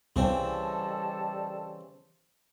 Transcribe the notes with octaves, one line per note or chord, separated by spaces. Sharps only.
C2 C#3 E3 G3 C4 A4 D#5 A5